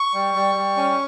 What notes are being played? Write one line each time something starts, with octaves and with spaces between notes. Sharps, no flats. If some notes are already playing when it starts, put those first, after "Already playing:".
Already playing: C#6
G3
G3
G3
C#4